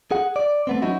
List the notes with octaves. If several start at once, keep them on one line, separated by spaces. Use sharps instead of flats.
G#4 F#5
D5
A3 B3 C4
F#3 C#4 D#4 E4 F#4